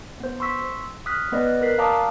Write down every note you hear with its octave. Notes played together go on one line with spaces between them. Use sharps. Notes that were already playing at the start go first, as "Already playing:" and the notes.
B3 C5
C6 C#6 E6 B6
D#6 F6 F#6 B6
B3 B4 D5 D#5
A#4 F#6 B6 C7
D5 F5 A5 A#5 D6 D#6